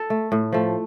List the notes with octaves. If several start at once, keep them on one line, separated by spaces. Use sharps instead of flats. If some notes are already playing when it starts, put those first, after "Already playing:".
Already playing: A4
A3
A2
F3 A3